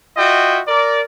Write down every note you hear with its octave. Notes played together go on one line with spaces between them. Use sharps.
F4 F#4 D#5 E5 G5
A#4 D5